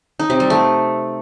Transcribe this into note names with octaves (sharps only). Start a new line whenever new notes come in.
D#4
C3
G3
A3